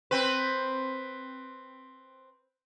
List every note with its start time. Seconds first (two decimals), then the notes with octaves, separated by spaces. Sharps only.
0.11 C4 B4